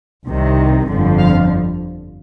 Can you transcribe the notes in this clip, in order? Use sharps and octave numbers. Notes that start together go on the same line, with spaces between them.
C2 C3 D#3
G1 F2 D3 F3
F5